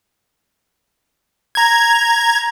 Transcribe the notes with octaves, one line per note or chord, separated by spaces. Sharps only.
A#5 G#6